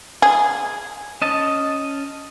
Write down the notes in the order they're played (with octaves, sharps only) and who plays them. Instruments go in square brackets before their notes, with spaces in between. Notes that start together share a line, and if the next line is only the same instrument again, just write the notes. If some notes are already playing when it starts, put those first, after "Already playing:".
[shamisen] G#4
[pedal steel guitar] C#4 D#5 A5